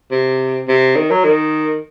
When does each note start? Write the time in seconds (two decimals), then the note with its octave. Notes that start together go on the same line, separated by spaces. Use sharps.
0.11 C3
0.68 C3
0.96 D#3
1.10 F#3
1.24 D#3